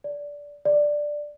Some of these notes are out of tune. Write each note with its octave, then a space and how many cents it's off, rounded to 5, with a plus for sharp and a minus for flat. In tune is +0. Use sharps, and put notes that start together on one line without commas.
D5 -15
D5 +5